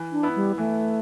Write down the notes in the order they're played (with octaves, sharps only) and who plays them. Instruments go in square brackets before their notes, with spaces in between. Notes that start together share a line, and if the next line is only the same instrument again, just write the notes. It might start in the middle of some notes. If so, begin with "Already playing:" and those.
Already playing: [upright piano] E3
[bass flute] D4
[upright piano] B3 E4
[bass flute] G3
[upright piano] E3 [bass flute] A3